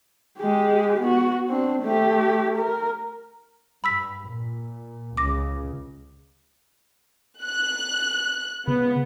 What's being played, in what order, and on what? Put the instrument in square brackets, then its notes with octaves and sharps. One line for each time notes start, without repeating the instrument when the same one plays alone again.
[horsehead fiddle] G#3 G4
B3 F#4
C4 D4
A3 G4
A#4
[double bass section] G2 [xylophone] B5 E6 B6
[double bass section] A#2
[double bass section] C#2 C#3 [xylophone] D6 A#6
[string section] F#6
[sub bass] C#3 [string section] B3